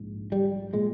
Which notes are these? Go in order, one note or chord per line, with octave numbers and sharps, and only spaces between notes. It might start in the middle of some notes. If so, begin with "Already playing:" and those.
Already playing: A#1 G#2
G3
A#2 G#3